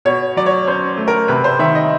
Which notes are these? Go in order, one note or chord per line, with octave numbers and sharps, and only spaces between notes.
B2 C#5
F#3 D5
C#5
C#4 C5
A3
A#4
C3 B4
C5
D#3 E5
D#5